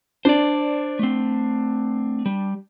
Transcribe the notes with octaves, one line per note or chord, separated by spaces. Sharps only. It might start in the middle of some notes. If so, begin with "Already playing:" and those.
D4 C5 D5
A3 C4
G3